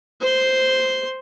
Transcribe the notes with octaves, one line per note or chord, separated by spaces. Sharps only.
C5 C6